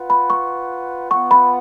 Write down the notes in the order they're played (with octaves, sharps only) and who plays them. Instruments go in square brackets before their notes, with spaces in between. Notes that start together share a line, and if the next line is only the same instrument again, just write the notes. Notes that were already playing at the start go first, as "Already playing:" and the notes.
Already playing: [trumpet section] F4 B4 F#5
[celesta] B5
C#6
[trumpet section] B3 F4 B4 F#5 [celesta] C#6
[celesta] B5